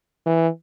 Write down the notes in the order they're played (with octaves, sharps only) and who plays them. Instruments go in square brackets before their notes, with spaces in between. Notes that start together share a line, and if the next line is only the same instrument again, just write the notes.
[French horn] E3